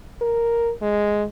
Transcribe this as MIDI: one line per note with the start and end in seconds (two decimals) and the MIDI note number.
0.21 0.72 70
0.82 1.24 56